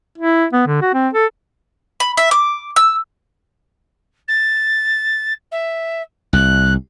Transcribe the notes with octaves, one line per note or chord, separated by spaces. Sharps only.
E4
B3
D3
F#4
C4
A4
B5
E5
D6
E6
A6
E5
C2 F#6